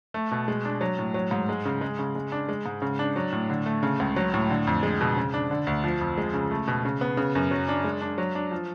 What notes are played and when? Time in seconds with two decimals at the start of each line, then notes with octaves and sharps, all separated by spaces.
0.14 A3
0.31 B2
0.48 G#3
0.65 D4
0.81 F#3
0.99 A2
1.14 F#3
1.31 G#2
1.49 G#3
1.65 C#3
1.81 G#3
1.99 C#3
2.15 G#3
2.32 D4
2.49 G#3
2.66 G#2
2.82 C#3
2.99 D4
3.16 F#3
3.32 A2
3.50 D3
3.66 A3
3.83 C#3
4.00 C#2
4.16 F#3
4.34 A2
4.50 D3
4.67 F2
4.83 G#3
5.01 B2
5.17 C#3
5.34 D4
5.51 D3
5.67 D2
5.84 F3
6.01 F2
6.18 G#3
6.34 C#3
6.51 A3
6.68 B2
6.85 C#3
7.01 B3
7.17 C#3
7.35 F#2
7.51 F#3
7.68 D4
7.84 G#3
8.02 D4
8.18 F#3
8.35 D4
8.51 F3